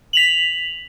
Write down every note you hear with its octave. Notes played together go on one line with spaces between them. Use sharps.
B6 F7 F#7